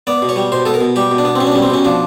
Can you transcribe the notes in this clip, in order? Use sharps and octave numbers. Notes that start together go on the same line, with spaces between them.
B3 D5
B2
C#5
G3
B2 C5
B3 A4
A#4
B2
G3 G4
B2
D4
B3
C4
B2 C#4
D4
G3 C#4
C4
B2 C#4
F3 D4